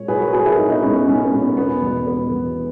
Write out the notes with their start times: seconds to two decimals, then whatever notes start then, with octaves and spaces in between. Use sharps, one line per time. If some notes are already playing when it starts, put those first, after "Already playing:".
Already playing: A#2 G#3 C#5
0.08 B1 G#4 B4
0.21 F#4 A#4
0.33 A#2 G#3 G#4 B4
0.46 E4 G#4
0.58 B1 D#4 F#4
0.70 B3 D#4
0.82 A#2 G#3 C#4
0.95 B3
1.07 B1 C#4
1.24 B3
1.32 A#2 G#3
1.41 B3
1.57 E1 B3
1.82 E2 B2
2.07 E1 B3
2.31 E2 B2